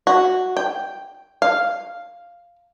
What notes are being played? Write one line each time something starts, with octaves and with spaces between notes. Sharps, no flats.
F#4
G5
F5